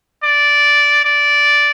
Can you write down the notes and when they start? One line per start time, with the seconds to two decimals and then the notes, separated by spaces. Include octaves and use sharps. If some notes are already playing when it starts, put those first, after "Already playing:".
0.24 D5
1.05 D5